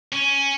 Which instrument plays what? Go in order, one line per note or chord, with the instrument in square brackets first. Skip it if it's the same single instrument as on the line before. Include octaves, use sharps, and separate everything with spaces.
[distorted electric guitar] C#4